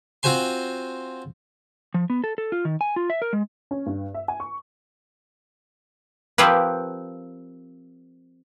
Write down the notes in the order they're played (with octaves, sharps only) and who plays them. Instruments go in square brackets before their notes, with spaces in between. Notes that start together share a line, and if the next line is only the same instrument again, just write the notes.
[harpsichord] C4 F4 F#4 C5 G#5 C6
[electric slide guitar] F3
B3
A4
A4
F4
D#3
G#5
F4
E5
A#4
G#3
[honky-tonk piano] C#4
G2
E5
G#5
C#6
[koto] F3 A#3 C4 G4 B4